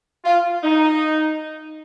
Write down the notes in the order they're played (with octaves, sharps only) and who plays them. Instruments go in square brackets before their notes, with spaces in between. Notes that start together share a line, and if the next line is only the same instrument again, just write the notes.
[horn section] F4
D#4